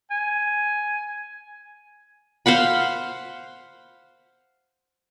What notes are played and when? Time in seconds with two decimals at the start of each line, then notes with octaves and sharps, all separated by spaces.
0.11 G#5
2.46 C5 F5 F#5 B5